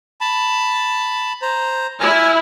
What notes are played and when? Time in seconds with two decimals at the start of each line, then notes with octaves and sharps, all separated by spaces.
0.21 A5 B5
1.42 C5 A#5
2.00 E4 G#5 F6